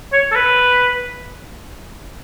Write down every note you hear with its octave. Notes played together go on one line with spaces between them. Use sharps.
C#5
A4
B4